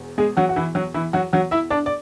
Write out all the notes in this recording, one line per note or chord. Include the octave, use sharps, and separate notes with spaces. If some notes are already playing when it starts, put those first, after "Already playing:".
Already playing: E1 E2
G#3 G#4
F#3 F#4
F#4
E3 E4
F#3 F#4
E3 E4
F#3 F#4
F#3 F#4
E4 E5
D4 D5
D5